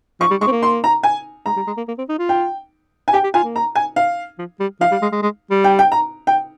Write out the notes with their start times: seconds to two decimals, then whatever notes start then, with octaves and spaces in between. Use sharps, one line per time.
0.20 F3 C#6
0.30 G3
0.41 G#3 C#6
0.47 C4
0.52 A#3
0.63 C6
0.84 A#5
1.03 G#5
1.46 G#3 A#5
1.56 G3
1.67 G#3
1.77 A#3
1.88 A#3
1.98 C4
2.09 D#4
2.19 F4
2.29 G5
3.08 G#5
3.13 G4 G5
3.24 G4
3.34 F4 G#5
3.44 A#3
3.56 A#5
3.75 G#5
3.96 F5
4.39 F3
4.60 G3
4.80 F3 F5
4.91 G3
5.02 G#3
5.12 G#3
5.22 G#3
5.51 G3
5.64 G5
5.79 G5
5.92 A#5
6.27 G5